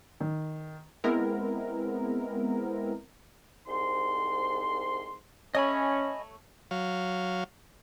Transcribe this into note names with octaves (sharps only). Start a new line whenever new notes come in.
D#3
G#3 B3 C4 E4 A#4
C2 G#2 C6
A3 C#4 C#5 D#5 G#5 B5
F#3 C#5 F5